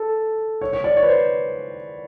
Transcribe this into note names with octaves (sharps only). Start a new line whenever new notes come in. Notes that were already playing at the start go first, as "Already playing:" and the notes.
Already playing: A4
C#5
C#5
D5
C#5
B4
C5